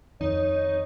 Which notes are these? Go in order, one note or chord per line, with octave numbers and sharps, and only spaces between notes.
F2 D#3 D#4 C#5